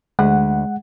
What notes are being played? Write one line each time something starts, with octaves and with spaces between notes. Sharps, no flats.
D2 G#3 F#5